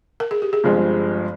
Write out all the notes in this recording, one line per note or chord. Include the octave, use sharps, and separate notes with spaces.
A#4
G#4
G4
G#4
G1 G2 F3 G#3 C4